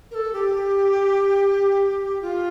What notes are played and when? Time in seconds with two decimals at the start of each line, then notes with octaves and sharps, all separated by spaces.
0.11 A#4
0.15 A4
0.33 G4
2.22 F4